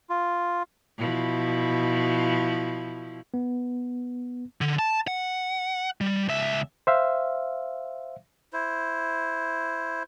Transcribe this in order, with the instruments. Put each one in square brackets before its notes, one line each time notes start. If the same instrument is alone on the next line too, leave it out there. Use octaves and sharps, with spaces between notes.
[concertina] F4
[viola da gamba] B2 F3 E4
[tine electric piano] B3
[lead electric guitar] D3
A5
F#5
G3
C#2 E5
[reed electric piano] C5 E5 F5
[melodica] E4 C5